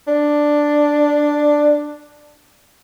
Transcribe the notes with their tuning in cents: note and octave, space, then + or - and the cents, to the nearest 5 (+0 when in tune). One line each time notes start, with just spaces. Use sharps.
D4 +5